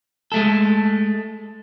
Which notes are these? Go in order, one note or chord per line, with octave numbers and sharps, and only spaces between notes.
G#3 A3 A4